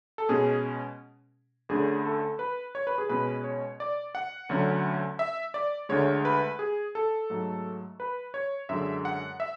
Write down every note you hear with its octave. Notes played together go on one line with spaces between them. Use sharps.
A4
B2 G#3 C#4 G#4
D2 D3 A3 C#4 G#4
A4
B4
C#5
B4
G#4
B2 G#3 C#4 B4
C#5
D5
F#5
D2 D3 F#3 C#4
E5
D5
D2 D3 G#3 C#5
B4
G#4
A4
G#2 F#3 A3
B4
C#5
F#2 D3 G#3 E5
F#5
E5